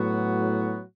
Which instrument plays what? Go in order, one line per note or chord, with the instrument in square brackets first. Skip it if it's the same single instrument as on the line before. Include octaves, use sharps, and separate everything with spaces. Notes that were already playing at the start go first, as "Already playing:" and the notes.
Already playing: [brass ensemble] A2 F#3 B3 F#4